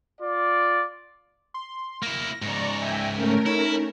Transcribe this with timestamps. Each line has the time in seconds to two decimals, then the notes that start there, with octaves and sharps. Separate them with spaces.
0.21 F4 D5
1.54 C6
2.03 A#3 E4 A#6
2.42 G#2 C#3 D5 A#5 C#6
2.78 E5 G5 G#5
3.14 A3 C#4 A#4
3.46 D#4 E4